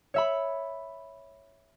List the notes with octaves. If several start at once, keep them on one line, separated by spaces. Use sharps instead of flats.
C#5 E5 B5